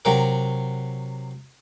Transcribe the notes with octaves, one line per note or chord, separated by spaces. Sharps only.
C3 F#3 A#4